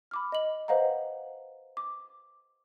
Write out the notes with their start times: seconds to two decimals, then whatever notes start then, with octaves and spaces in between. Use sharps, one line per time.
0.11 B5 D6 F6
0.32 D#5 F#7
0.68 B4 C5 D#5 F5 F#5 A#5
1.77 D6